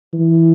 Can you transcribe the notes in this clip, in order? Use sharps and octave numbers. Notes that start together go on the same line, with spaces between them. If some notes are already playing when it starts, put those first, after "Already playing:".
E3